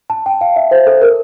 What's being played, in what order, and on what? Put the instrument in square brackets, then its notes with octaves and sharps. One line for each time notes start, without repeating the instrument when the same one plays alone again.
[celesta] A5
G5
F5
E5
C5
A4
A#4